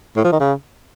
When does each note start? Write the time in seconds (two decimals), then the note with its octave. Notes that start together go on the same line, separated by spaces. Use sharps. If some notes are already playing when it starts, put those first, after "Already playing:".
0.16 A2
0.24 F3
0.32 D#3
0.40 C#3